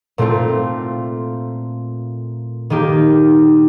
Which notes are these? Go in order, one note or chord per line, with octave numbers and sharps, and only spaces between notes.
A#2 A3 C4 F4
D#3 A#3 D#4 G4